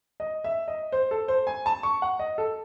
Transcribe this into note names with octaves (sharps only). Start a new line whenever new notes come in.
D#5
E5
D#5
C5
A4
C5
G#5
A5
C#6
F#5
D#5
A4